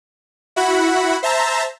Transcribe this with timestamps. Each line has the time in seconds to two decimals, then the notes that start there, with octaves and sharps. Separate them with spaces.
0.56 E4 F#4 F#5 B5
1.23 C5 E5 A5 A#5